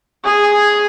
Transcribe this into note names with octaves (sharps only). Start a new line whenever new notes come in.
G#4